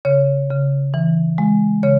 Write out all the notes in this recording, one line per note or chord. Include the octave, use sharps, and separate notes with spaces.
C#3 C#5
C#3
E3
G#3
C#3 C#5